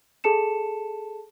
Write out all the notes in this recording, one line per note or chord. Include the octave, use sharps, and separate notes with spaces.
G#4 A4 A5 C#7 E7